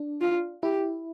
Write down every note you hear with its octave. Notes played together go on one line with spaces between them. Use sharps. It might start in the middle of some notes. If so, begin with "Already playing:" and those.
Already playing: D4
F4
E4 G4